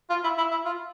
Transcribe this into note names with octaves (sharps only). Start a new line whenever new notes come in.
F4
E4
E4
E4
F4